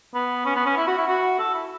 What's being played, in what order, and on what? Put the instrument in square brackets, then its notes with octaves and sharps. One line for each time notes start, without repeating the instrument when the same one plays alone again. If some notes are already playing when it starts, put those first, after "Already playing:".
[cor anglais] B3
C#4
B3
C#4
E4
F#4
E4
F#4
A4
E4